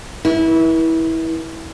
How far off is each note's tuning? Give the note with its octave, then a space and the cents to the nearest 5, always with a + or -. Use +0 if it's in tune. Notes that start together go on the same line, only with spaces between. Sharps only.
E4 -20 B4 -45